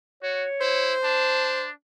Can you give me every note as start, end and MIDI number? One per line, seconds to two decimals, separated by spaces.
0.23 0.46 66
0.23 0.96 73
0.61 0.94 64
0.61 1.65 72
1.04 1.71 62
1.04 1.52 81